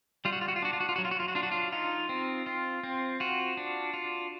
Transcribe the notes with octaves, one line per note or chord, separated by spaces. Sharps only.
G3 F4
F#4
F4
F#4
F4
D4 F#4
F4
F#4
F4
F#3 F#4
F4
F#4
F4
F#4
D4 F4
F#4
F4
D#4 F4
C4
F4
C4
F4 F#4
D4
F4